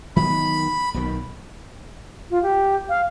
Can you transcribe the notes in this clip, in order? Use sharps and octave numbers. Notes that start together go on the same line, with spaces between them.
D#3 F#3 B3 B5
B1 B2 D#3
F4
G4
F5